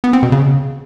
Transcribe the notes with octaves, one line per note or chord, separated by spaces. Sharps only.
B3
C4
B2
C#3